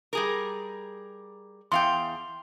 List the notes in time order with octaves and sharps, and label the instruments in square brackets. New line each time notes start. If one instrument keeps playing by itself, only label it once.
[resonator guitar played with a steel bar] G3 G#4 A#4
[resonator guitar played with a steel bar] E2 F5 G5 [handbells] C6